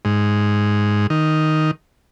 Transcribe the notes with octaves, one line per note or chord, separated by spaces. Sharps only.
G#2
D#3